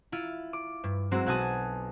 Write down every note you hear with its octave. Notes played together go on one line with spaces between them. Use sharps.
E4 F4
D6
G2
F#3 G#3 C4 E4 F#4
B1 F#4 F#5 G#5 A5 D#6